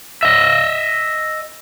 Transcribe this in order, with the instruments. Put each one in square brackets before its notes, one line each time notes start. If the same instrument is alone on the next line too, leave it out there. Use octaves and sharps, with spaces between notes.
[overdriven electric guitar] D#5 E5